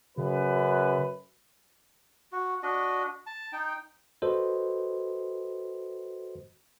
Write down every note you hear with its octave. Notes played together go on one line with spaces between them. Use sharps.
F#2 C#3 B4
F#4
D4 F#4 D#5
A5
D#4 G5
F#4 A4 B4 C5 D#5